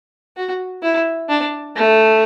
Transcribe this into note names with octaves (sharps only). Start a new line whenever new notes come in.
F#4
E4
D4
A3